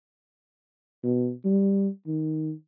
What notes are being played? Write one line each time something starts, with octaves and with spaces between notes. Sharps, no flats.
B2
G3
D#3